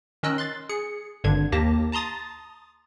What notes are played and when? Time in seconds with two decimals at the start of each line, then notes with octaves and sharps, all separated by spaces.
0.23 D#3 C#4 A#4 D#5 E6 F#6
0.38 C6 F#6 A6
0.69 G#4 C#7
1.24 G#1 G2 D3 D4 G#6
1.52 D#2 A#3 G4 A5 A#6
1.92 A5 A#5 C6 D#6 A6